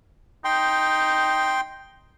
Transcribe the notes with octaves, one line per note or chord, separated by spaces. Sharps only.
D#4 G5 C6